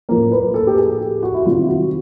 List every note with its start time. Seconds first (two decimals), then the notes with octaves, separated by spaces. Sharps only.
0.09 A2 F3 A#3 A#4
0.32 B4
0.54 A4
0.67 G4
0.78 G#4
1.00 G4
1.23 F#4
1.34 E4
1.45 C3 D#3 G3 C4 F4
1.68 F#4